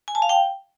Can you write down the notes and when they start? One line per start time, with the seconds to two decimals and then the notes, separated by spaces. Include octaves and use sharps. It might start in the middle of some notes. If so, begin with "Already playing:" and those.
0.08 G#5
0.15 A5
0.22 F5
0.29 G5